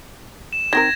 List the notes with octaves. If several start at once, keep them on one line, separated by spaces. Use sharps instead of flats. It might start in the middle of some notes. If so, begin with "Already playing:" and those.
E7
D#3 C4 A#4 G#6 A#6